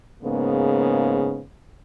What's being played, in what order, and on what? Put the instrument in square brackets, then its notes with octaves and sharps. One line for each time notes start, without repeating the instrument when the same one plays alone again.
[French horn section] G#2 C#3 A#3 B3